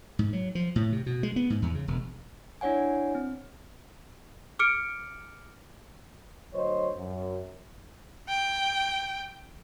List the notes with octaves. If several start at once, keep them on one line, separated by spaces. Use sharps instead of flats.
G#2
F#3
F3
A2
C3
B2
G#3
B3
G#2
E2
C#3
E1
D4 E4 C#5 F#5 G#5
C4
D6 F6 C#7 D7
D2 F#3 C5 C#5 D#5
F#2
G5